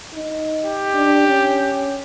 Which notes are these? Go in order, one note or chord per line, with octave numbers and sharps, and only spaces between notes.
D#4
G4
D4
C#4